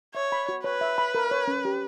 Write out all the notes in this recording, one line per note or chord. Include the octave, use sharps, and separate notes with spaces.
C#5 E5
B5
F#4
B4 C#5
E5
B5
A#4
C#5
C#4
G4